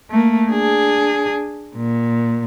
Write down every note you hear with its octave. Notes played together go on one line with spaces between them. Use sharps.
A3 A#3
D4 G#4
A#2